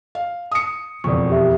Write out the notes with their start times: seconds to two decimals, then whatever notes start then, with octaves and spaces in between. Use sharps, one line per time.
0.15 F5
0.52 D#6 C#7
1.04 E1 F2 D5 C#6
1.30 G4 E5